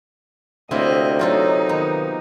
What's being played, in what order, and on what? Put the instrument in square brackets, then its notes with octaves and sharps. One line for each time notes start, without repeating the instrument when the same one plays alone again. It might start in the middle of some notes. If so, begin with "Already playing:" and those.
[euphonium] D2 [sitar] C3 A#3 [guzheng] C4 E4 [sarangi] D#5
[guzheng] F#3 F4 A4 [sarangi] D#4
[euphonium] D#3 [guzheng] B3